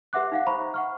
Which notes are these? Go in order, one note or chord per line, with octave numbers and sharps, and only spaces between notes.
G4 B4 E5 F#5 D6 F#6
D#4 F5 F#5
C5 E5 A#5 B5 C#6
F#5 C#6 F6